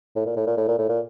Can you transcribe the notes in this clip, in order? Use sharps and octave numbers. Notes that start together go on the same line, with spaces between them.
A2
A#2
A2
A#2
A2
A#2
A2
A#2